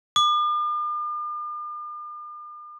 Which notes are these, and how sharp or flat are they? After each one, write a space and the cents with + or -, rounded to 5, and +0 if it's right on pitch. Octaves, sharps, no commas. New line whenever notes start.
D6 +45